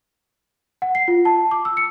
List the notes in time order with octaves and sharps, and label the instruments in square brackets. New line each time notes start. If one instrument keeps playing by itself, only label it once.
[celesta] F#5
C7
F4
A5
D6
E6
C#7